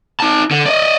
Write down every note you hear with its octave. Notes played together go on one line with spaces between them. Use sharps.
D#4 A5
D3
D5 D#5